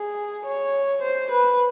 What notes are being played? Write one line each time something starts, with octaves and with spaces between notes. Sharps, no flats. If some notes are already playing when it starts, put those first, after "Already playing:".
Already playing: G#4
C#5
C5
B4